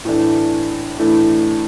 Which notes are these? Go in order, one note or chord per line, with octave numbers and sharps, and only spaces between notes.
A2 E3 A3 D4
A2 E3 A3 D4